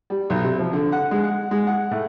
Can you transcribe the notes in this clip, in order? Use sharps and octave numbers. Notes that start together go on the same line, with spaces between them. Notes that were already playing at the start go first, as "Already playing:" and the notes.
G3
B1
C3
F3
D3
F#5
G#3
F#5
G#3
F#5
A2